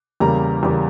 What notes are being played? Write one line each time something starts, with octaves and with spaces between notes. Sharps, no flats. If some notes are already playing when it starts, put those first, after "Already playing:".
E2 C#3 G3 A#3 A#5
E2 C#3 G3 A#3